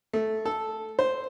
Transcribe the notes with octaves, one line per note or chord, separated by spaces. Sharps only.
A3
A4
C5